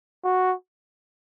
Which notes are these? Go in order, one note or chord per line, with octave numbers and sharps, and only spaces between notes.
F#4